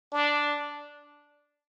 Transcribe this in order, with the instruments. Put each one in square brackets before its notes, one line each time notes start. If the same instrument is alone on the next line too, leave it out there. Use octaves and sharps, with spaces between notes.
[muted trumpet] D4